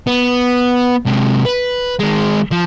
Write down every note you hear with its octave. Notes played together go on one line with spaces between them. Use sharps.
B3
C3 G#3
B4
D#3 G#3
F3